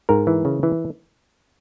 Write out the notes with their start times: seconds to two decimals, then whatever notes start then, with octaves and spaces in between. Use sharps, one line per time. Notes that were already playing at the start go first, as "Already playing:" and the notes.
0.09 G#2 A#4
0.27 E3
0.45 C#3
0.63 E3